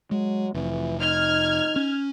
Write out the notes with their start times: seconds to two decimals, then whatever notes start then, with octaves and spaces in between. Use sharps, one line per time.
0.11 F#3 G#3
0.54 F1 E3
1.01 D#4 F6 G#6
1.76 C#4